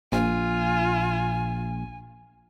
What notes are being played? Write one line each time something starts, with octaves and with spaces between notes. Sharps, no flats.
A#1 F4 G#5